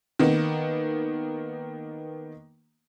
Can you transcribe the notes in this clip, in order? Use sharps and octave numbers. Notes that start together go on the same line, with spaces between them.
D#3 A#3 B3